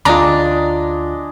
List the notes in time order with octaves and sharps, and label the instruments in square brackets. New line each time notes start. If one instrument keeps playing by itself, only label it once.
[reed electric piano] D2 F4 [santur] G#3 D#5 D6 [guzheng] D4 [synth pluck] A#5